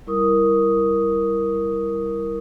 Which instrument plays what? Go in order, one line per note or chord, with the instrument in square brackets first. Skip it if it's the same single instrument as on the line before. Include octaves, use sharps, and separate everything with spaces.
[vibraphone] G3 E4 A#4 C#6 D#6